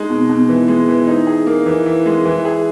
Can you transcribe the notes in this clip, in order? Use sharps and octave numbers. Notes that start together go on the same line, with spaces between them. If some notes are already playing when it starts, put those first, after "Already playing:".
Already playing: G#3 D#4
B2
B2
E3
G#3
E3
D#4
G#4
A#3
E3
E3
G#3
E3
G#4